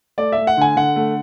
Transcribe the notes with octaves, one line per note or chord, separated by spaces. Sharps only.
A3 D5
A3 E5
F#5
D3 G#5
D3 F#5
A3